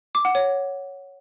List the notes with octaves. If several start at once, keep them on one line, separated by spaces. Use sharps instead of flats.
D6
F#5
C#5